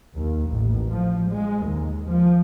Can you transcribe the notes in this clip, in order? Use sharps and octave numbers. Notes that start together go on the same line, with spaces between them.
D#2
A1
F3
G#3
D#2
F3